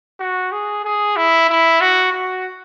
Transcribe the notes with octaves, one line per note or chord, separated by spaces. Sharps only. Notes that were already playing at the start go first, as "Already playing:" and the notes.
F#4
G#4
G#4
E4
E4
F#4
F#4